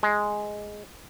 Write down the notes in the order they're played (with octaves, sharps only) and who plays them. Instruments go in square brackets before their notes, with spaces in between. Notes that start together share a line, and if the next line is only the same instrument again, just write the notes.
[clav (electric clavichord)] G#3